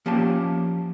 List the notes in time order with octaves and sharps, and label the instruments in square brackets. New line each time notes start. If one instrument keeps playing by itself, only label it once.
[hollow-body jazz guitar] F3 A#3 C#4 G4 A5